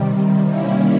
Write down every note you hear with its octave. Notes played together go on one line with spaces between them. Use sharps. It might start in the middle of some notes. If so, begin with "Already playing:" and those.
Already playing: C3 D#3 G3
D#3 G3 A#3 C#4 E4